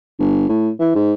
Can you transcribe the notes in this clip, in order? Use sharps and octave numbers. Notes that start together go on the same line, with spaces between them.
G1
A2
E3
G#2